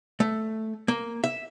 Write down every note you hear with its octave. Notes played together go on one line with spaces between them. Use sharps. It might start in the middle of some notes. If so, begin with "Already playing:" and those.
A3
A#3
E5